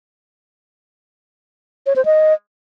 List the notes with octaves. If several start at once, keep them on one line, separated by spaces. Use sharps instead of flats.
C#5
C5
D#5